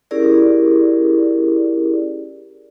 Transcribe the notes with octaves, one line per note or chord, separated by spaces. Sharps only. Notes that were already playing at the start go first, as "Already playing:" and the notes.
C#4 E4 G4 G#4 A#4 D5